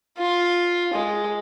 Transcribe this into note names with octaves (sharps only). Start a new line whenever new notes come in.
F4
G#3